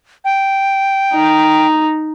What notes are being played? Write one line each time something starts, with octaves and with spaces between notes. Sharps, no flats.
G5
D#4